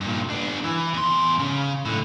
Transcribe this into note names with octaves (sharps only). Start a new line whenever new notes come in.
G2 A#2
B3 D4
E3
E2 C6
C#3
A2 D3